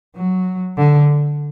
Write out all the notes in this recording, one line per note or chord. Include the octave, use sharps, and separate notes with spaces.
F#3
D3